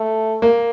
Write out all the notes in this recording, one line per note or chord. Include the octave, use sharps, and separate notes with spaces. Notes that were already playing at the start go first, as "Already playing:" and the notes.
Already playing: A3
A#3